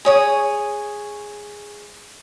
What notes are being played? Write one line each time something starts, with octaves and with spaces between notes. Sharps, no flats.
G#4 C#5 D#6